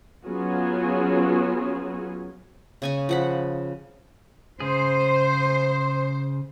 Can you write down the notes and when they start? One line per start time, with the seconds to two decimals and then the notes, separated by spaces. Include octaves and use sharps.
0.24 F#3 B3 C#4 F4 F#4 G#4
2.82 C#3 G#5 C#6
3.09 F3 F#5 B5
4.60 C#3 G#4 C5